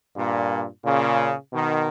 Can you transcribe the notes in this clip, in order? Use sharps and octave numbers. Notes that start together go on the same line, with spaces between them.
G2 A#2
A#2 C#3
B2 D#3